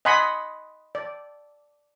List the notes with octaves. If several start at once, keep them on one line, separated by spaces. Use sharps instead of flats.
D#5 F#5 G#5 B5 C6 D#6
D5